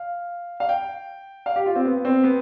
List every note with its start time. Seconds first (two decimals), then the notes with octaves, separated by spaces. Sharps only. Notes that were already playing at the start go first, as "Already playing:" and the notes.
Already playing: F5
0.60 F5
0.69 G5
1.46 F5
1.56 G4
1.66 F4
1.76 C4
1.85 B3
2.05 C4
2.23 B3